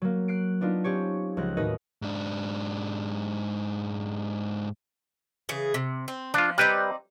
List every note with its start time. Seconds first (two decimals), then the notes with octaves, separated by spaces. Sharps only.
0.02 F#3 A#3
0.28 F#6 C7 D7
0.61 B3 D4 D#4 F4
0.84 C4 C#4 G4 C#5
1.37 C#2 F3 F#6 A#6
1.57 D#2 A2 D#4 F#4 B4 D#5
2.02 G#2 D4
5.49 C#3 E3 G#4
5.74 C3
6.08 C4
6.34 F3 D4 F4
6.58 G3 C4 D#4 G4 B4 D5